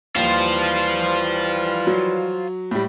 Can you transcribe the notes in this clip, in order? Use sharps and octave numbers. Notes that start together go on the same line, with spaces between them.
D#2 E3 F3 G3 F4 C5
F#3
A2 G3